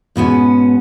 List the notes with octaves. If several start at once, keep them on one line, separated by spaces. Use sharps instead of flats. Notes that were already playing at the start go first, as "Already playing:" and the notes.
G#2 B2 B3 C#4